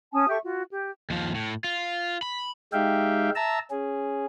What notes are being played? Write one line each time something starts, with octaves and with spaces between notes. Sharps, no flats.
C#4 G#5 A5 D#6
G4 A4 E5 C#6
F4 F#4
G4
D#2 F3
A2
F4
B5
G#3 D#4 G4 E5 F5 G5
E5 A5 A#5 E6
C#4 G#4